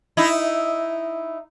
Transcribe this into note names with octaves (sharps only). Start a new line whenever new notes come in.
D#4 E4